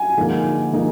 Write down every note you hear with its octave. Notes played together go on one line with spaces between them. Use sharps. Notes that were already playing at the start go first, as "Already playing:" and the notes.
Already playing: G#5
D3 F3 A#3 D#4 G#4
D3 F3 A#3 D#4 G#4